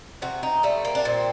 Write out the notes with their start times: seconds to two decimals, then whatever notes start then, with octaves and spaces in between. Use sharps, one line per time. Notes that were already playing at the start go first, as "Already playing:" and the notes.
0.22 C3 F#4
0.43 D#4
0.63 G3 A3
0.85 A#3
0.95 D4
1.05 A#2 C4